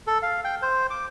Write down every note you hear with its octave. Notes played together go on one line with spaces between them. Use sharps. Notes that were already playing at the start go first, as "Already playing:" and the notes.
A4
F5
G5
C5
D6